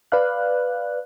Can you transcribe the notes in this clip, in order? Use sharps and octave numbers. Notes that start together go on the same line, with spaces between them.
B4 D5 F5 F#6